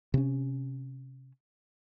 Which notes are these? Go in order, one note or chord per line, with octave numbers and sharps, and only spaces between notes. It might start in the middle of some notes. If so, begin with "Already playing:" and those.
C3 C#4